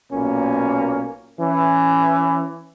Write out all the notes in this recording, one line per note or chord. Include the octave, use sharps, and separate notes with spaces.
B1 A#2 A#3 C#4
E3 C#4